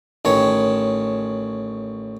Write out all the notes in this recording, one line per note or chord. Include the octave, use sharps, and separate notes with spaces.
A1 D#3 C#5